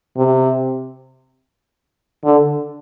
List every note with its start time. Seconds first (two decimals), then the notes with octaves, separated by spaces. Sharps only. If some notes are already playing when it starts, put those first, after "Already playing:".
0.17 C3
2.24 D3